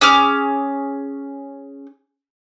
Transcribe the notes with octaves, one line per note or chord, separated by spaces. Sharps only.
C#4 G#4 D6 F6